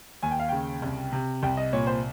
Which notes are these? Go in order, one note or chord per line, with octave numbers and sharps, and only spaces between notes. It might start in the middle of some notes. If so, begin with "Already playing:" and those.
D#2 G#5
G5
F5
C#3 G5
C2
C3
C2 G5
D#5
A#2 C#5
C5